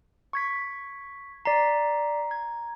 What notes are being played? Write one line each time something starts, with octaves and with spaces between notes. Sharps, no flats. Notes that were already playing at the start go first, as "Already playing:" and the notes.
C#6 G#6 B6
D5 A#5 B6 C7
G#6